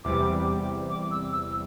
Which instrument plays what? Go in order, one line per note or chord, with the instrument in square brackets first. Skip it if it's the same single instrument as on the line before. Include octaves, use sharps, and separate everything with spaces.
[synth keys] E2 C3 G3 [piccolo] D6
[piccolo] D6
E6
E6